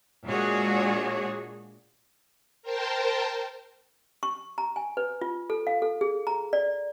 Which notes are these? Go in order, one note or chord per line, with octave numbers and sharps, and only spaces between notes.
A#2 G#3 D4 F#4 G#4 C#5
A#4 C5 G5 A5
C#6
A#5
G#5
B4
F4
A4
F5
A4
G#4
A#5
D5